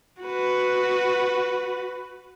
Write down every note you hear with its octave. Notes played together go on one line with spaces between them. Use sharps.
F#4 B4